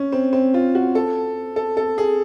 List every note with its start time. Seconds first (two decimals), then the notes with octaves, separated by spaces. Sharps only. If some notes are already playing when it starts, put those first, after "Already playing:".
Already playing: C#4
0.12 C4
0.33 C4
0.54 F4
0.75 F#4
0.95 A4
1.56 A4
1.77 A4
1.98 G#4